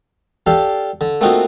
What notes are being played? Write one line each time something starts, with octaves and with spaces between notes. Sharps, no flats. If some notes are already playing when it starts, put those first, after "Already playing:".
D4 G4 A4 D5 F5
D3
A3 A#3 C4 D#4 F4 F#4